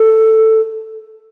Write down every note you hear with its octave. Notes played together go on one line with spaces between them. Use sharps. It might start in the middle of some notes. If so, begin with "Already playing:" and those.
Already playing: A4